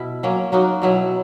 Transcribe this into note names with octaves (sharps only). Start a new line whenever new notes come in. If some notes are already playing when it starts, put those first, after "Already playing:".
Already playing: B2 E4
F#3 A#3 C#4
F#3 A#3 D#4 F#4
B2 F#3 B3 E4